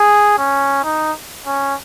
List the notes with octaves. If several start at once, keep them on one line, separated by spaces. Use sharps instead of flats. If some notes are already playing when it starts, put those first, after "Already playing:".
Already playing: G#4
C#4
D#4
C#4